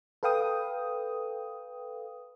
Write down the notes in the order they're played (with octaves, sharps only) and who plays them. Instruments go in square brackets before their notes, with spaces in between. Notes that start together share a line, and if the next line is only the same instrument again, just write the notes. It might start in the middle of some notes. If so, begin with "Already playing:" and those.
[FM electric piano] A4 B4 F5 G5 D#6